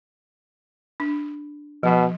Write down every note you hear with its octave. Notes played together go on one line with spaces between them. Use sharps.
D4
B2 F3